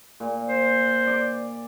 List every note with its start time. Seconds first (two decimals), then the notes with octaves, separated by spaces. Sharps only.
0.20 A#2
0.48 C5
1.07 D5